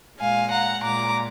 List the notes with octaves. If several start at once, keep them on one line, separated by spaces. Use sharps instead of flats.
A#2 G#3 F5 G#5
F#5 A#5
A#2 G#3 A#5 D6